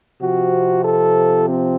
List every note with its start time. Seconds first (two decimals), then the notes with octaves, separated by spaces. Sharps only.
0.20 C3 F3 C4 F#4
0.83 A4
1.47 C4